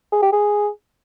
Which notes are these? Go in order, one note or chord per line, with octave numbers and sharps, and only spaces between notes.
G#4
G4
G#4